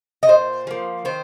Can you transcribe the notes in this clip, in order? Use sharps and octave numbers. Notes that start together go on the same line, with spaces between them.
D#5
A#2 C5
F3 A#3
D#3 C5